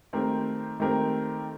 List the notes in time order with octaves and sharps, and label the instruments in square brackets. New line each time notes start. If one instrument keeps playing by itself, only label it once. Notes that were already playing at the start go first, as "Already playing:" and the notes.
[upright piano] D#3 A3 C4 G4 A#4
D#3 A3 C4 G4 A#4